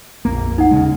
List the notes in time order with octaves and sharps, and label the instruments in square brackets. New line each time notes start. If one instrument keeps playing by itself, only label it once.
[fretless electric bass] A#1 F2 A#3
[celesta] D#4 F#5
[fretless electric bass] D#2 C#3 G#3